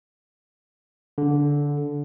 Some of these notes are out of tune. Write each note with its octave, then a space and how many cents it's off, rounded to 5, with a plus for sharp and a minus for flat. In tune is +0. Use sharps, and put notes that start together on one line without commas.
D3 -15